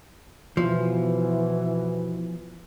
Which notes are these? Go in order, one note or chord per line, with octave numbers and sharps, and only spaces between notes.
B2 E3 F3